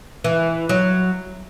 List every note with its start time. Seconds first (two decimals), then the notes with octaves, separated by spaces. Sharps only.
0.24 E3
0.69 F#3